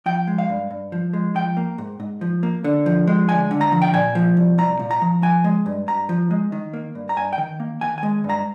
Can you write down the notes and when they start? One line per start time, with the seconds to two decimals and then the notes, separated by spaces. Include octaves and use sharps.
0.06 F3 G5
0.27 G#3
0.38 F5
0.49 G2
0.71 G2
0.92 F3
1.13 G#3
1.35 F3 G5
1.57 A#3
1.78 G#2
2.00 G#2
2.21 F3
2.43 A#3
2.64 D3
2.86 F3
3.08 G#3
3.29 D2 G#5
3.51 D3
3.61 A#5
3.72 F3
3.82 G5
3.93 A#2 G#5
4.15 F3
4.37 C2
4.58 C2 A#5
4.79 A#2
4.91 A#5
5.02 F3
5.22 F3 G#5
5.44 G#3
5.66 G2
5.88 G2 A#5
6.09 F3
6.31 G#3
6.52 D#3
6.73 A#3
6.95 G2
7.09 A#5
7.17 G2 G#5
7.33 G5
7.38 D#3
7.60 A#3
7.81 D#3 G#5
7.98 G#5
8.03 G#3
8.24 G2
8.30 A#5